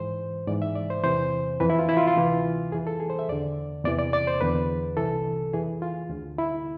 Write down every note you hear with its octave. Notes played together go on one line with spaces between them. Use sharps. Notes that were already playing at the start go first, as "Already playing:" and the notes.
Already playing: G#2 E3 C5
G#2 E3 D5
E5
D5
C5
E2 C3 E3 C5
F2 E3 B4
E4
F4
E4
F4
F4
D2 C3 E3
F2 E3 G#4
A4
G#4
C5
E5
E2 D3 D5
E2 C3 E3 D5
D5
D5
C5
E2 D3 B4
C2 C3 E3 A4
F2 E3 G#4
F4
D2 D3
E4